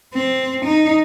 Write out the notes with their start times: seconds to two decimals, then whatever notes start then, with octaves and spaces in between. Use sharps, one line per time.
0.14 C4
0.66 D#4